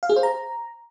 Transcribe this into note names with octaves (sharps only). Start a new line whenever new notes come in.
F5
G#4
C5
A#5